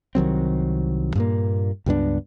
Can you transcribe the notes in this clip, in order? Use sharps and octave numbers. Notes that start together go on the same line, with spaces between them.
C2 D#3 F#3 C4
G2 A#2 A#3
C#2 G2 B3 D4